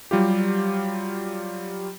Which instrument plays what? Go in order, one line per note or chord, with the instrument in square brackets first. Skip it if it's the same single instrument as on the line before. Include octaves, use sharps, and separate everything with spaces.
[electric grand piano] F#3 G3 F4 G4